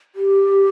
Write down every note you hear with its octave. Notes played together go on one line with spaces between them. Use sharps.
G4